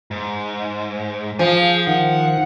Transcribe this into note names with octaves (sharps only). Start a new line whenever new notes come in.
G#2
F3 G#4 G#5
D#3 F#5